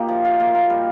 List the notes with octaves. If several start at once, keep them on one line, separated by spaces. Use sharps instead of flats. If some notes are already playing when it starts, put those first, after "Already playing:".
Already playing: A#2 A#3 D#4 G4
F3
F4
A#3
A#4
G3